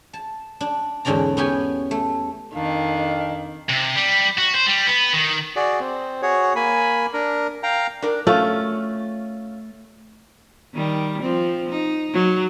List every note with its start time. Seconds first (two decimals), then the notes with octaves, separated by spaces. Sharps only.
0.13 A5
0.61 D4
1.05 E2 G#2 D3 C#4 D5 A#5
1.37 B3 C#4 G4 G#5
1.91 A3
2.54 F2 D#3 D4 F5
3.69 C3
3.96 G3
4.38 F#4
4.54 C5
4.67 G3
4.87 B3
5.13 D#3
5.56 F#4 G#4 D5
5.80 C4
6.22 F#4 G#4 C#5
6.56 A#3 G#5 B5
7.13 D4 A#4
7.63 F5 G5 A#5
8.02 D4 A#4
8.27 A3 C#4 F4
10.74 D#3 G3
11.22 F3 C4
11.70 D#4
12.13 F#3